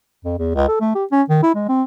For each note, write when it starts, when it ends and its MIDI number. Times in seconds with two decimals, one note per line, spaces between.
0.25 0.35 41
0.39 0.52 40
0.55 0.67 37
0.68 0.78 69
0.81 0.93 57
0.95 1.05 67
1.11 1.22 61
1.29 1.38 51
1.43 1.53 64
1.55 1.68 56
1.69 1.83 60